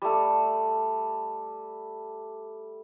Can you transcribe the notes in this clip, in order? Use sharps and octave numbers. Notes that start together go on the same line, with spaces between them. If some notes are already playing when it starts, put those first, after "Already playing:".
G3 A3